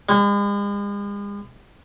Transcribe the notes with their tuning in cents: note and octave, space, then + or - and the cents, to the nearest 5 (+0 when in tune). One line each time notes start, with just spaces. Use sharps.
G#3 -45